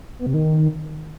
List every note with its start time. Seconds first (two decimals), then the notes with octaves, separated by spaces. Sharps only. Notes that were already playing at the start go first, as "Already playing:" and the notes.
0.19 B3
0.26 C3
0.34 D#3